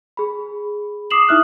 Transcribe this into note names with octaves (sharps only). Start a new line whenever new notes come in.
G#4 B5
D6 D#6 C7 E7 F#7
D#4 E4 E5 D#6 F6 F#6